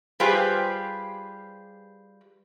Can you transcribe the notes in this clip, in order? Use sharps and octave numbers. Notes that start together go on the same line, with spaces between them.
G3 F4 G4 G#4 B4 C5